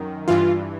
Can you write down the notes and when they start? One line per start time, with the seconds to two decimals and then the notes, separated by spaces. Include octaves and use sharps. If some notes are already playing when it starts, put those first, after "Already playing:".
Already playing: F#2 D#3
0.28 G2 E3 F4